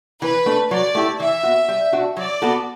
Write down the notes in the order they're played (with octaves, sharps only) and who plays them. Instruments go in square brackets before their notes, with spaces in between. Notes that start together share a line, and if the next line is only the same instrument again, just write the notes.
[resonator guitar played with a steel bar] E3 [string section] B4
[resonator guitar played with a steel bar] A3 D4 A4
[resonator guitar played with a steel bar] F#3 [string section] D5
[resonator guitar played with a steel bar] A3 E4 G4
[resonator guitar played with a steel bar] E3 [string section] E5
[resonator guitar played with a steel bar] B3 F#4
G3
D4 F#4
[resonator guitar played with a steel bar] F#3 [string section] D5
[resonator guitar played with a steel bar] B3 F#4 A4